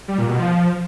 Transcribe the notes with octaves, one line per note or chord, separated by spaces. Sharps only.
G3
A#2
B2
F3